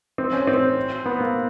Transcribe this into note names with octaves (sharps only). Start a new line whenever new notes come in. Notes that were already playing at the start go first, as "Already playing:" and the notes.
C4
C#4
C4
B3
A#3